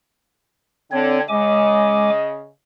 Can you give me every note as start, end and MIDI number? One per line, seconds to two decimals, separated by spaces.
0.92 1.21 50
0.92 1.20 60
0.92 1.20 73
1.29 2.49 49
1.29 2.10 56
1.29 2.49 75
1.29 2.10 80
1.29 2.10 86